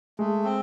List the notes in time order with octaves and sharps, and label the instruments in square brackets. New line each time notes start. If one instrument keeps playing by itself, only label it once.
[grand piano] G#3 [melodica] A3
[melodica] C4